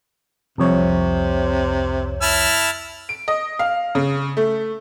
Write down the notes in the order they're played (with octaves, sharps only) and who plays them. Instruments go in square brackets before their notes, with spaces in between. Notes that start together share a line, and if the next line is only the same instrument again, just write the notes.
[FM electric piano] C2 F2 C#5 [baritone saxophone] C3
[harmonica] E4 A5 F6
[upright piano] D7
D#5
F5
C#3
A3